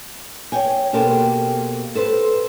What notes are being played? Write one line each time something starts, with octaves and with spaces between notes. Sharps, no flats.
C#5 G5 G#5
B2 A#3 G4 A4 C5 A5
A4 B4 C5